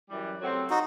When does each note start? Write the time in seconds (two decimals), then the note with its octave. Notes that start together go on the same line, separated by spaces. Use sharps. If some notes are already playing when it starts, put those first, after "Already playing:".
0.10 F#2 E3 G3
0.40 C3 F#3 A3 C4 F#4
0.70 D#4 F#4